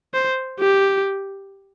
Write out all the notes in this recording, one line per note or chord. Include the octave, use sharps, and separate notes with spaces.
C5
G4